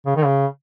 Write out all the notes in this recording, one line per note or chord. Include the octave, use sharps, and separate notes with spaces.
C#3
D#3
C#3